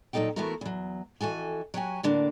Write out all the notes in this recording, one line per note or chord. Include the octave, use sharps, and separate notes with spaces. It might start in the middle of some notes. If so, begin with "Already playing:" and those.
A#2 F#3 G#3 D#4 A4 G5
E3 A3 B3 E4 F#4 A#4
E2 F#3
F2 E3 F#4 A4 G#5
F#3 F#4 G4 G#5
A2 D3 A#3 D4